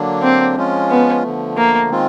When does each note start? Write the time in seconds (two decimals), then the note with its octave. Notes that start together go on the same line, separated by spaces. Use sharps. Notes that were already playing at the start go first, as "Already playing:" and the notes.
Already playing: D3 F#3 A#3 D4
0.22 C4
0.55 F3 G#3 C#4 F4
0.90 B3
1.23 D3 F3 A3
1.57 A#3
1.90 D#3 G#3 C4 F4